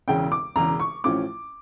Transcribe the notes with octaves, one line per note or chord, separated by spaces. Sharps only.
E1 E2 C#3 G5
D6
E1 E2 C#3 A#5
C#6
A1 A2 F3 C#4 D6